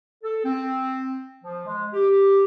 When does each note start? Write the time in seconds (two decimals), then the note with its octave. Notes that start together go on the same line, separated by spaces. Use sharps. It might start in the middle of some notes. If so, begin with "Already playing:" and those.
0.23 A4
0.44 C4
1.43 F3
1.66 G#3
1.94 G4